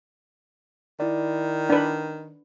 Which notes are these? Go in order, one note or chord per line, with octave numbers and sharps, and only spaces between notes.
D#3 E4 D5
D4 B4